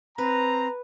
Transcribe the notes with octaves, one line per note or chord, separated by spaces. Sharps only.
C4 B4 A#5